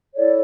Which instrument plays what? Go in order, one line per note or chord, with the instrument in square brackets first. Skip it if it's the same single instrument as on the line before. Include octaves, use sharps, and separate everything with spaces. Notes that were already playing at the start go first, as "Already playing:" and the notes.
[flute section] E4 A4 C#5 D5